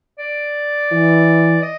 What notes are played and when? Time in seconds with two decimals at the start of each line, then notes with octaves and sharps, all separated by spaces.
0.19 D5
0.91 E3
1.62 D#5